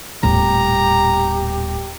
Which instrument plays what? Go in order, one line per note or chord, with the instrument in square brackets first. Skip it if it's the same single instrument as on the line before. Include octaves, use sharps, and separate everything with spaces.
[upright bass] D#1 B3 [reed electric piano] A2 [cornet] G4 [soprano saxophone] A#5